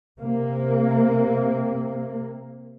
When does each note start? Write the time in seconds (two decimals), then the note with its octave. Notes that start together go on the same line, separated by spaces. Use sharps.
0.19 C3 A#3